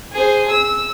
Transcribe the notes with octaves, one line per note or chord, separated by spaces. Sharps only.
G#4 C5
E6